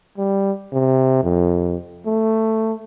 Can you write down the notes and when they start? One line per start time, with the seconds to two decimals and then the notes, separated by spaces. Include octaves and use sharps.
0.18 G3
0.73 C3
1.23 F2
2.06 A3